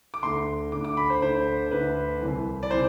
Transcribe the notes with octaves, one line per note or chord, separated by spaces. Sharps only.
D6
D2 D3 C6
D2 D3 D6
D6
B5
C5
D2 D3 C5
D2 D3 B4
C2 C3 E3
D5
C3 E3 C5